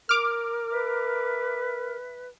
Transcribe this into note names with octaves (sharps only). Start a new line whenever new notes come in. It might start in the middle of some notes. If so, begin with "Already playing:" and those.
A#4 D6 F6
B4 E5